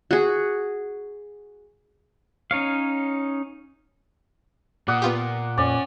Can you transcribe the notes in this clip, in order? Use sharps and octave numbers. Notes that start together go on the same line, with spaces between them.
F#4 G#4
C#4 D#4 C#5 F5
A#2 D5 F#5 D#6
B3 F4 G4
F2 C#4 D5